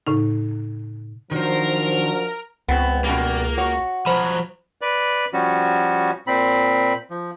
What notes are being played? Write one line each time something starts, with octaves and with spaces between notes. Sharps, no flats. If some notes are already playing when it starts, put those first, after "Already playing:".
A2 C#3 D#4
D#3 F3 F#3 D4 A#4 C5
C#2 B3 C4
F#2 B2 G3 A#3
F#4 C#5
F3 F#3 C5 B5
B4 D5
F3 G3 C#4 F#4
A#2 C4 B5
F3